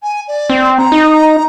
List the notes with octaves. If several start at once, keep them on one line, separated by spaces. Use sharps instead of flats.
G#5
D5
C4
A#5
D#4